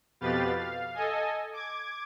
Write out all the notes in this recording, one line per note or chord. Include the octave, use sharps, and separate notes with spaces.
F2 B2 G4 B4 F5 A6
F5
A4 D#5 G#5
D6 G#6